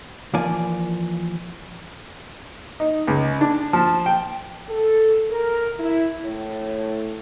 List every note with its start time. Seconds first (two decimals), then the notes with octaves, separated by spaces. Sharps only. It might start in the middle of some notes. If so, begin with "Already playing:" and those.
0.34 E3 F3 A#3 D5 G#5
2.80 D#4
3.08 C#2
3.41 D4
3.73 F3
4.06 G5
4.69 A4
5.30 A#4
5.79 E4
6.24 A2